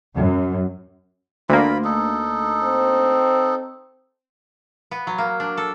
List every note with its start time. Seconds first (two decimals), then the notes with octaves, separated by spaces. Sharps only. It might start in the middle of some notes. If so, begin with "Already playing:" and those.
0.16 F#2
1.49 D2 A#3 F4 B5
1.84 D#4 A4
2.63 C4
4.91 B3
5.07 F#3
5.18 A#3
5.40 D4
5.57 A4